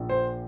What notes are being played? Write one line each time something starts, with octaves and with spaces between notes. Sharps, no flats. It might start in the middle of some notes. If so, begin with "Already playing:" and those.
Already playing: A#1 A#2
C5